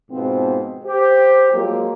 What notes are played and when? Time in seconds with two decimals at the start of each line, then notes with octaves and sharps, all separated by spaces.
0.11 G#2 B2 F3 B3 C4
0.85 G4 C5
1.53 F3 F#3 G#3 A#3